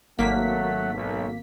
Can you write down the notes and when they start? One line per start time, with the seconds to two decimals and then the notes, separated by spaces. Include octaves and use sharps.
0.19 G#1 F#3 A3 A#3 F#5 B6
0.93 B1